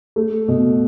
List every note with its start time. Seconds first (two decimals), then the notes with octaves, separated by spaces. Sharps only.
0.16 A3
0.48 B2